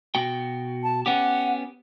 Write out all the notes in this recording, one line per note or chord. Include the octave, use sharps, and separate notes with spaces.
B2 F#4 G5
A5
B3 C#4 G4 F#5